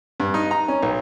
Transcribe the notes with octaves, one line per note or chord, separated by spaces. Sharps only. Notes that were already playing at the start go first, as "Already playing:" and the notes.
G2
D#4
A#5
C#4
B1